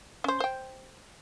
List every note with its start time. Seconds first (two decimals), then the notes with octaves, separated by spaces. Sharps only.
0.24 C#4 C5
0.40 C5 G5